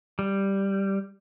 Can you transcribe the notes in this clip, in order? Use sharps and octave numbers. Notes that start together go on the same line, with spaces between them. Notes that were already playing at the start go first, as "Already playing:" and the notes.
G3